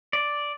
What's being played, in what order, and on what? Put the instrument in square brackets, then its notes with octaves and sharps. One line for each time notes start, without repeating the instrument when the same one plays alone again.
[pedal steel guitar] D5